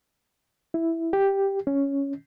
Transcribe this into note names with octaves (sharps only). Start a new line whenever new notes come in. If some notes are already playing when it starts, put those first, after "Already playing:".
E4
G4
C#4